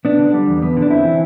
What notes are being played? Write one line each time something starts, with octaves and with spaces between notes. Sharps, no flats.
B3 D4
D3
G3
E2
B3
D3
D4
C4 E4
E3